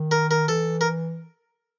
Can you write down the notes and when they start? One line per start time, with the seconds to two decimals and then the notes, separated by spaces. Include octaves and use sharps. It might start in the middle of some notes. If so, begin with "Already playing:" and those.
Already playing: D#3
0.11 A#4
0.31 A#4
0.48 E3 A4
0.81 A#4